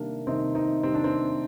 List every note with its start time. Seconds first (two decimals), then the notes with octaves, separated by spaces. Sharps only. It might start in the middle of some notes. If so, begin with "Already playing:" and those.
Already playing: C3 D#3 G3 A#3 D4
0.27 C3 D#3 G3 C4 D#4
0.55 C4 D#4
0.83 C3 D#3 G3 C4
0.94 D4
1.04 C4